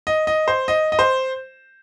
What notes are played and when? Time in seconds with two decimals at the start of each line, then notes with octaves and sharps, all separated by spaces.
0.07 D#5
0.27 D#5
0.48 C5
0.68 D#5
0.92 D#5
0.99 C5